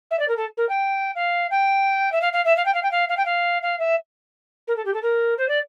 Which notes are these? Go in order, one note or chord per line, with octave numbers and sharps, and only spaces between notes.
E5
D5
A#4
A4
A#4
G5
F5
G5
E5
F5
F5
E5
F5
G5
F5
G5
F5
F5
G5
F5
F5
E5
A#4
A4
G4
A4
A#4
C5
D5